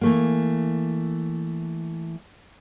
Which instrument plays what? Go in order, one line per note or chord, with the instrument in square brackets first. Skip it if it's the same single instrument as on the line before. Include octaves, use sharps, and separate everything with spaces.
[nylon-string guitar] E3 A3 A#3